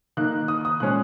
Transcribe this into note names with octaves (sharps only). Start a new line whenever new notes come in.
D#3 A#3 D#4 F#6
D#6
D#6
A#2 G#3 C#4 F#6